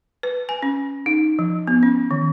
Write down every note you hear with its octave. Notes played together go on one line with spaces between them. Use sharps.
B4
G#5
C#4
D#4
F3
B3
C#4
D#3